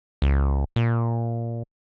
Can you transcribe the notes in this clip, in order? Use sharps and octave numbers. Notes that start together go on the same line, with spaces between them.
C#2
A#2